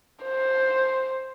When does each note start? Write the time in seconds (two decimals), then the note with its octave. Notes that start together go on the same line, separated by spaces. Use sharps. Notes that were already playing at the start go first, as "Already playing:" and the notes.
0.24 C5